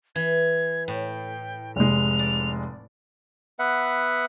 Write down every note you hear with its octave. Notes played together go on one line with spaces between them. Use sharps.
E3 G#6
A2 G5
F1 G#3 F7
D5
B3 B4 E5 F#5